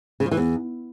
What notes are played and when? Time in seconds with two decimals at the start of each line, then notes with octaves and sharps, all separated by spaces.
0.20 C#3
0.26 F3
0.31 E3
0.37 E2